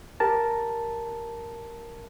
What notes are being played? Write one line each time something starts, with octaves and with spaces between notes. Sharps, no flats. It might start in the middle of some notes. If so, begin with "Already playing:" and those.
G4 A#4 A5